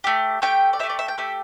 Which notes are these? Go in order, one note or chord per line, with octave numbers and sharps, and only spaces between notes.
A3 G4
A3 G4 G5
D5
A3 G4 E5
D5
E5
G5
A3 G4 E5